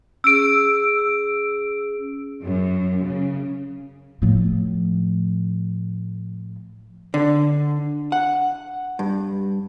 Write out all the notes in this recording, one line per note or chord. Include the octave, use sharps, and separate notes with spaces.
C#4 G#4 E6 D7
F#2
C#3
A2 F3
D3
F#5
G2